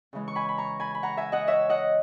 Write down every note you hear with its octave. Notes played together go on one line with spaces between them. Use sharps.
C#3 E3 G#3
C#6
G#5 B5
B5
A#5 C#6
G#5 B5
B5
F#5 A#5
E5 G#5
D#5 F#5
C#5 E5
D#5 F#5